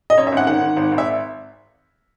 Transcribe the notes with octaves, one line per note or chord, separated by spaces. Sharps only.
D#5
F#2 C#5
E5
G#1 F#5
D#3 F#5
D#3
G#1
G#1
E5